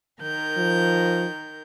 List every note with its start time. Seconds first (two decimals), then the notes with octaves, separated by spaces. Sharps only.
0.21 D#3 A#4 G6
0.57 F3